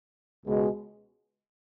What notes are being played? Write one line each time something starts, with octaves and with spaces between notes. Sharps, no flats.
C#2 B2 G#3